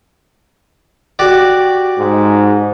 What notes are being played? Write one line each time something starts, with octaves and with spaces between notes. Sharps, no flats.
F#4 G4 D5
G#2